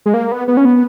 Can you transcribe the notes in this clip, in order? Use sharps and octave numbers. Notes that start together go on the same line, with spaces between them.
G#3
A#3
B3
B3
C#4
B3